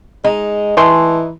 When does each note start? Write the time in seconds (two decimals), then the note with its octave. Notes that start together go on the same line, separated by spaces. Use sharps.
0.25 G#3 D#4
0.77 E3 G#3 A3 C6